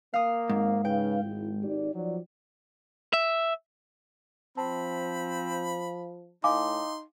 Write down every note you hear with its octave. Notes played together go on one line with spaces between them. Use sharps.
A#3 F5 D#6
G#1 G#2
C#3 D#4 B4 F5 G5
G#1 G#3 E4
D#4 G4 D5
F3 F#3 D#4 D5
E5
F3 C4 A5 B5
A2 D#4 F5 G#5 C6 D6